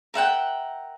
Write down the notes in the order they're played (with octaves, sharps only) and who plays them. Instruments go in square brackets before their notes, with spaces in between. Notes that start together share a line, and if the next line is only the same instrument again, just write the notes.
[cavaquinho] A#4 E5 F#5 G5